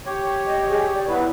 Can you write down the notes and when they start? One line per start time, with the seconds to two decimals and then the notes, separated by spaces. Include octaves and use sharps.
0.06 G4 C#5
0.47 D#5
0.69 G#4
0.94 D5
1.08 F#3 B3 E4 B4